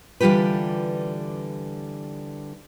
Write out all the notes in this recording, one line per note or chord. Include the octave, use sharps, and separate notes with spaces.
D3 E3 G3 F4 G4 B4